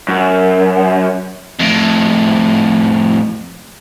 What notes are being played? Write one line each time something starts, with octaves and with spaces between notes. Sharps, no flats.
F#2
F2 A2